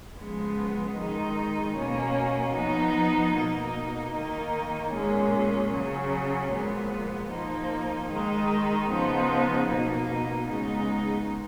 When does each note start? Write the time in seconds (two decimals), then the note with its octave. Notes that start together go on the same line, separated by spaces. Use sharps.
0.17 C#3 F3 G#3 B3
0.97 D#3 G#3 D#4
1.75 B2 A#3 C#4
2.54 F3 B3 D#4
3.34 B2 A#3 D#4
4.13 D#3 A#3 D#4
4.93 A#2 G#3 C#4
5.71 C#3 F#3 C#4
6.51 A#2 F3 G#3 B3
7.30 F3 A#3 D#4
8.09 D#3 G#3 D#4
8.88 C#3 F3 B3 D#4
9.68 B2 A#3 D#4
10.47 C#3 G#3 B3 D#4